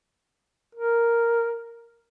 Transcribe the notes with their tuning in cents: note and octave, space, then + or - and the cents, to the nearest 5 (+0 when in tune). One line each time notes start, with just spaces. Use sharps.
A#4 +0